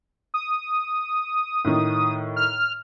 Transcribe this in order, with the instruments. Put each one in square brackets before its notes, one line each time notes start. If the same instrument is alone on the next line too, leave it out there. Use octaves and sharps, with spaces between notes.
[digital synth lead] D#6
[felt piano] A2 D#3
[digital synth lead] F6